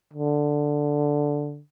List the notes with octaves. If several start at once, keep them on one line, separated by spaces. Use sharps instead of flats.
D3